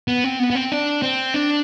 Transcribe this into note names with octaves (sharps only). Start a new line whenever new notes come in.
B3
C4
B3
B3
C4
D4
C4
D4